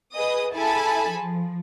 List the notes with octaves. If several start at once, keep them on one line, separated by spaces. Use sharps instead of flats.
G#4 B4 D#5 D#6
E4 G#4 A4 G#5 A5 B5
F3